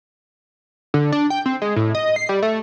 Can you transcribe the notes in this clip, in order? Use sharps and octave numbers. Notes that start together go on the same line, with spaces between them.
D3
D4
G5
C4
G#3
A2
D#5
C7
G3
A3